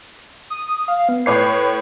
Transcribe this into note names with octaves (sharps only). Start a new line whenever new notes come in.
D#6
F5
B3
A2 B4 C#5 C7